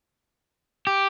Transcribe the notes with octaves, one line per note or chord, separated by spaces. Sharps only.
G4